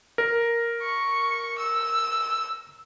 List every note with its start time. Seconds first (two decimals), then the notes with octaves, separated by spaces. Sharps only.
0.18 A#4
0.83 C#6
1.59 E6